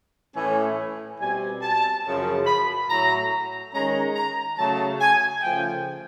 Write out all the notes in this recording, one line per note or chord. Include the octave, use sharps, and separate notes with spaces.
A2 E3 A3 C#4 G#5
B2 G3 C4 G#5
A5
F#2 C#3 F3
B5
A2 F#3 A3 A#5
D#3 G#3 C#4 A#5
A#5
C#3 F#3 A3 A5
G#5
C#3 F3 A3 G5